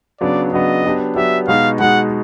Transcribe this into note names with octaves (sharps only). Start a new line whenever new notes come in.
C#3 F#3 B3 D4 D5
C#3 F#3 B3 D4 D#5
F#3 B3 D4 G4
F#3 B3 D4 G4 E5
B2 G#3 B3 D#4 F#4 F5
B2 G#3 B3 D#4 F#4 F#5